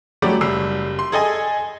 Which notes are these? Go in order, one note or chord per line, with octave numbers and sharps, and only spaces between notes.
F#3 G3 A3 C#4 G4 D5
F#1 G3 E6 C7
C6
G#4 A4 D#5 G#5